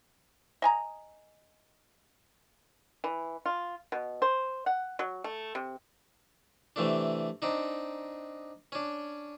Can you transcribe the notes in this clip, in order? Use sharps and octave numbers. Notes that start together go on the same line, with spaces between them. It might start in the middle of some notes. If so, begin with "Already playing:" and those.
D#5 G#5 A#5
E3
F4
B2
C5
F#5
F#3
A3
C3
C3 E3 A3 D4
C4 D4 D#4
C#4 D4